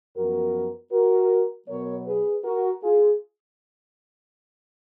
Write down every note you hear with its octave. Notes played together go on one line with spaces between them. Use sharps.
F#2 F3 B3 F#4 A#4
F#4 A#4
B2 F#3 B3 A#4 C#5
G#4 B4
F#4 A#4
F4 G#4